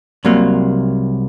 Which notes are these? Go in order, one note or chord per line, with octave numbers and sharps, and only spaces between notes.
C2 C3 F#3 A#3